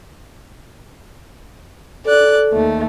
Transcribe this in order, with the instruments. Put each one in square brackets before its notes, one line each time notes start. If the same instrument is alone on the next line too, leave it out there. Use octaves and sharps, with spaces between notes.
[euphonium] A4 [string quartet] D5 F#6
[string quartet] D#2 A3